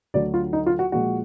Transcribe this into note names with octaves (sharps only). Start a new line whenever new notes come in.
D2 D3 F#3 D5
F4
D#4
F4
F#4
A#2 F3 G#3 F#4